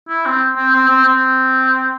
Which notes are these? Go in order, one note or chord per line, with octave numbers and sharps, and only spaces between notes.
E4
C4
C4
C4
C4
C4